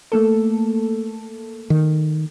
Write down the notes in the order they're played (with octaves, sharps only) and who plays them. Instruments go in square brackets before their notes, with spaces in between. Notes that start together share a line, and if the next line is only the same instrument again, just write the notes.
[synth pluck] A3 A#3 A4
[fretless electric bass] D#3